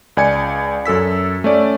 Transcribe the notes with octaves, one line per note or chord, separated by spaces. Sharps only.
C#2 D5 G#5 G#6 C#7
F#2 A4 E6 B6
A3 C#4 D5